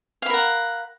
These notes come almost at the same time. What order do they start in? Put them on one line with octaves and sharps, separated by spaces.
F5 B5 A#4 F#5